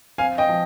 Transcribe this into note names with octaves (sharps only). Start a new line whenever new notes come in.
C4 F5 G#5
D#5 G5
F3